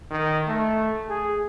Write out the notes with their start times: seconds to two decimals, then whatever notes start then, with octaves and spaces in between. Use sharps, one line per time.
0.10 D#3
0.47 A3
1.09 G#4